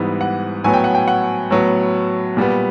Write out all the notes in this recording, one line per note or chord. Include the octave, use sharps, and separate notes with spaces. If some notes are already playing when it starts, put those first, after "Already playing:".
Already playing: G#2 E3 G3 B3
F#5
A2 F#3 B3 G#5
G5
F#5
G5
F#5
A2 F#3 B3
A#2 G3 B3